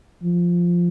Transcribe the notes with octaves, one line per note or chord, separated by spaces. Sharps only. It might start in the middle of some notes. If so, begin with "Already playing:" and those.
F3